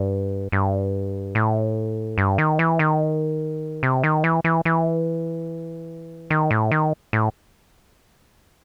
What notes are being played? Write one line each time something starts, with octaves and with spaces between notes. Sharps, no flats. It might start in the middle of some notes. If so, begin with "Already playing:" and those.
Already playing: G2
G2
A2
G2
D#3
E3
D#3
C3
D#3
E3
E3
E3
D#3
A2
D#3
A2